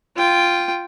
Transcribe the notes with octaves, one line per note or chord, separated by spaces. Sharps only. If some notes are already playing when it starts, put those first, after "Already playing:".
F4 G5